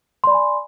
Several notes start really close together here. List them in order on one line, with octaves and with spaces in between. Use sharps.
C6 D5 B5 G#5